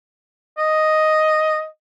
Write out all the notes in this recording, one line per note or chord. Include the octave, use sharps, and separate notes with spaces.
D#5